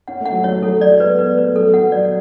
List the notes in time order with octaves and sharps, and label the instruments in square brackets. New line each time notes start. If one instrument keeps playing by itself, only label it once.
[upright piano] C#4 [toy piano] F#5
[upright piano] A3
[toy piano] F#5
[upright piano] F#3
[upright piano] F#3 [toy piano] C#5
[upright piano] F#3 [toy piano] A4
[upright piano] F#3 [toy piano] D5
[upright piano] G#3
[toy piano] B4
[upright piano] B3
[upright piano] B3 [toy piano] B4
[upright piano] A3 [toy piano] B4
[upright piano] F#3 [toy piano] A4
[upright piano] F#3
[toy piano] F#5
[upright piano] F#3
[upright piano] F#3 [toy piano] D5